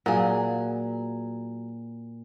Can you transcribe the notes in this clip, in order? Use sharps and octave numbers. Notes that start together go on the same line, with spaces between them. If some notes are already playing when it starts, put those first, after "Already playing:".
A#2 F#3 G#4